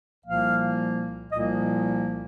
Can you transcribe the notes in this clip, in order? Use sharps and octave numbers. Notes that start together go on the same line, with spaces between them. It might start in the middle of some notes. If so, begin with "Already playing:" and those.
C2 A#2 F3 A#3 F5
C2 A#2 F3 A#3 D#5